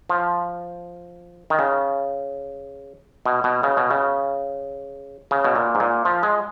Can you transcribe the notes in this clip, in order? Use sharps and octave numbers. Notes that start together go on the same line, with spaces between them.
F3
D#3
C#3
B2
B2
C#3
B2
C#3
C#3
B2
A#2
G#2
A#2
F3
G#3